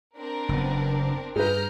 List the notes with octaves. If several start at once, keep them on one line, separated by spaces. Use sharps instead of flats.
C4 D4 A#4
F#1 B3
G2 G#4 B4 A#5 F6 G6